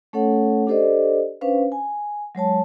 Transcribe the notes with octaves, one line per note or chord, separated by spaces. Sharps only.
A3 C#4 A4 C#5 F#5
D4 G4 A4 C5 D5 D#5
C#4 D4 B4 C5 F5
G#5
F#3 G#3 C#5 A5